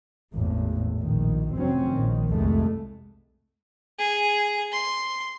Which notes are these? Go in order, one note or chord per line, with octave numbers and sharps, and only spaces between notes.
G#1 E2 A2
A#1 D#3
F1 F#3 C4 C#4
A#1 D#3
C2 F2 G#3 A3
G#4
C6